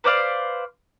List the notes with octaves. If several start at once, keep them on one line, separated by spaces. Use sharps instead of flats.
B4 C5 D5 F5